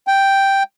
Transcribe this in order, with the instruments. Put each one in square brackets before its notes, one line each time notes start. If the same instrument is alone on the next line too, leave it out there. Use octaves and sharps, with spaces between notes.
[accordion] G5